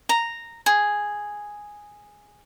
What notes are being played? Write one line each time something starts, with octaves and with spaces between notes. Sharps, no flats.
A#5
G#4